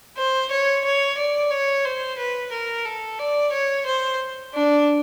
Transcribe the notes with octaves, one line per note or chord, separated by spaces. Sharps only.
C5
C#5
C#5
D5
C#5
C5
B4
A#4
A4
D5
C#5
C5
D4